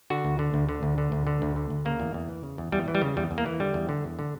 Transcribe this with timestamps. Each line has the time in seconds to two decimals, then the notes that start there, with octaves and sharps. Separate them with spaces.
0.10 D3 F#4
0.25 D2
0.39 D3
0.54 D2
0.69 D3
0.83 D2
0.98 D3
1.12 D2
1.27 D3
1.42 D2
1.56 D3
1.70 D2
1.85 C#3 A#3
2.00 E2
2.14 E2
2.28 E3
2.43 C#3
2.58 E2
2.72 E2 G3
2.88 E3
2.95 G3
3.02 C#3
3.17 E2 G3
3.31 E2
3.38 A#3
3.46 E3
3.60 D3 G3
3.74 E2
3.89 D3
4.04 E2
4.19 D3